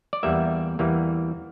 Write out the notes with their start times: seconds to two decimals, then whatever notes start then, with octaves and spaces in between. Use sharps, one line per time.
0.13 D5
0.23 E2 E3 G3 A#3 E5
0.79 E2 E3 G3 A#3